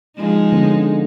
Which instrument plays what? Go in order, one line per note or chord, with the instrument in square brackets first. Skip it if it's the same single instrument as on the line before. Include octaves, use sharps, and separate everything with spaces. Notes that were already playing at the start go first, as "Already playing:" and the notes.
[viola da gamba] F3 G#3 D#4
[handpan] D3 B3 C#4